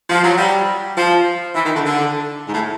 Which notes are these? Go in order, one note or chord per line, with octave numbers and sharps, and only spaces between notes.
F3
F#3
G3
F3
E3
D#3
D3
D3
G#2
A2